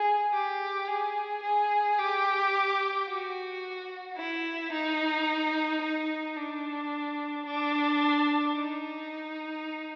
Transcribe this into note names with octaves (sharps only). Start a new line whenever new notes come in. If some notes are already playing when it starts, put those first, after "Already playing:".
Already playing: G#4
G4
G#4
G#4
G4
F#4
E4
D#4
D#4
D4
D4
D#4